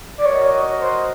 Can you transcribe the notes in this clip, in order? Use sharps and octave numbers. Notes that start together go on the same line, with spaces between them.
D5
F#4 A#4 C#5 D#5
C5